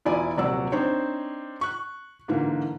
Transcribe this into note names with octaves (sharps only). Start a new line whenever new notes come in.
E1 E4 F4 D5 G#5
D#1 C3 F#3 D5 F#5 E6
C4 D4 D#4 C5 C#5
C#6 F#6
G#2 D3 E3 A#3